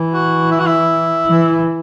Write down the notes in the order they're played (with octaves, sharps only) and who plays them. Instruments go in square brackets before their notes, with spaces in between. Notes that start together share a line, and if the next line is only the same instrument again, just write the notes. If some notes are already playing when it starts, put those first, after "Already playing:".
Already playing: [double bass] E3
[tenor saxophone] F#4
E4
F#4
E4
[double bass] E3